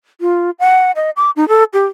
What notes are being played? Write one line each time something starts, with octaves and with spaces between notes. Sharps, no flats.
F4
F#5
D#5
D6
D#4
A4
G4